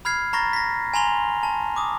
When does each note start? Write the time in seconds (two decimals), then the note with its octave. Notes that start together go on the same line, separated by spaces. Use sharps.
0.05 B5 F6 G#6 C7
0.33 A#5 B5 C#6 A6 A#6
0.53 A#6 B6
0.94 G#5 A#5 C6 F7 G7
1.43 A5
1.76 D6 D#6